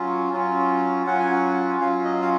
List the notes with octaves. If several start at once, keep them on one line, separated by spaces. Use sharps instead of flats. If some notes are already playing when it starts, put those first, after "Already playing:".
Already playing: F#3 C#4 F4
F#3 C#4 F4
F#3 C#4 F4 F#5
G#5
F#5
F#3 C#4 F4 F5
D#5
F5